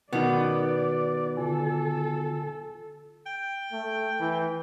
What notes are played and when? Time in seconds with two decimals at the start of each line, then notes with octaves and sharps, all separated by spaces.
0.13 B2 D#3 B3 D5
1.37 D3 F4 A4 G#5
3.26 G5
3.72 A3
4.20 E3